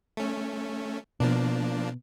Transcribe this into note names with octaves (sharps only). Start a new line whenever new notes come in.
A3 C#4
B2 F3 A#3 D4